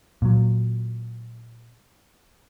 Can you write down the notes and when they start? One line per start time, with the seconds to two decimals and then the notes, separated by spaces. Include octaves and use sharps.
0.22 A#2 F#3